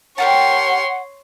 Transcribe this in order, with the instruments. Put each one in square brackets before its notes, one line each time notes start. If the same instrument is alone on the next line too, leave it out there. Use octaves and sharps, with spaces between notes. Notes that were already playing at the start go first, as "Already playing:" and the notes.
[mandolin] G4 A#4 A5 [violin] C#5 C6 [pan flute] F#5